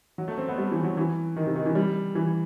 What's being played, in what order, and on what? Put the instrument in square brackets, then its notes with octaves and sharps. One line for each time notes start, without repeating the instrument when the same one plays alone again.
[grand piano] F#3
A3
C4
B3
G3
E3
F#3
E3
D#3
C3
D#3
E3
G3
E3